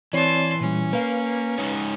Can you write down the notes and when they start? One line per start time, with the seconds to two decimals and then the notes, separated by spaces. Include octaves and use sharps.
0.13 E3 C4 C#5 D5 A5 C6
0.61 A#2 G3 C#4
0.93 A#3 B4 F5
1.58 G#3 D#4 C#5